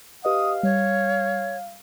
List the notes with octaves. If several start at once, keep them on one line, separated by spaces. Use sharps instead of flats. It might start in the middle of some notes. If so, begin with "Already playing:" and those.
G4 B4 D#5 F5 D#6
G3 C#5